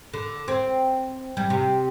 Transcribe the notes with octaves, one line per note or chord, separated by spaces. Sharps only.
D3
C4
G3
C3